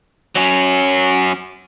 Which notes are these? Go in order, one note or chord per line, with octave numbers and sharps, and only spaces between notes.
F#3 C#4